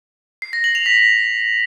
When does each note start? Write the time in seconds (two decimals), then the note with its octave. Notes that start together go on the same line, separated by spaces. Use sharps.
0.42 C7
0.53 A#6
0.64 F#7
0.75 F7
0.86 B6